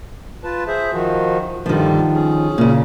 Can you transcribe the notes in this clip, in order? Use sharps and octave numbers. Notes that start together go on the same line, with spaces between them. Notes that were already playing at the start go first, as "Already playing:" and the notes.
F4 B4 A5
G#4 C5 E5
D#3 F3 F#4
G2 D3 D#3 F3 G3
C#4 G#4
A#2 C#3